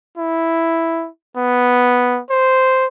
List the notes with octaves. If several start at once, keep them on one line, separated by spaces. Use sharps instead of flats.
E4
B3
C5